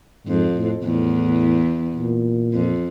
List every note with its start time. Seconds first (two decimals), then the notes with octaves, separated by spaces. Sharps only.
0.26 F2 G#2
0.55 A2
0.83 E2 A2
1.96 A#2
2.53 F2